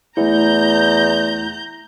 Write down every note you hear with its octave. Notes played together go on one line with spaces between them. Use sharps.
E2 A3 E4 A#5 G6